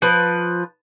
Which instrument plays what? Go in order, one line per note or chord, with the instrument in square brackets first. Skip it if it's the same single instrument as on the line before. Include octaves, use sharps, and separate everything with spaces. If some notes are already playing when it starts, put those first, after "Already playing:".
[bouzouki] F3 B4